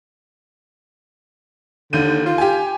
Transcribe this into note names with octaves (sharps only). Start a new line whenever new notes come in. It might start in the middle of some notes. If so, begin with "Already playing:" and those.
D#2 D3 G6 D#7
F4
G4 G#5